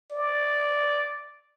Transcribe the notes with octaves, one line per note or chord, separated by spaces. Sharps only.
D5